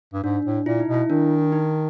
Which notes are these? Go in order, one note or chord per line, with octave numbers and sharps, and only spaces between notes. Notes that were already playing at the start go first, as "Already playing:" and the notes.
G2
G#2 D4
A2
A#2 E4
D#4
B2
E4
D#3 D4
D#4